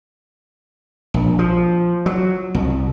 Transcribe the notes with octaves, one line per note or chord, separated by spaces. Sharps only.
A#1
F3
F#3
C2